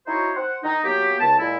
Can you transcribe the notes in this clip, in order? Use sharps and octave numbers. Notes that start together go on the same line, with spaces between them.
D#4 E4 F#4 C5 C#5
C5 F#5
D#4
F#3 A#3 B3 G4
C#2 A5
A#2 G#3 E4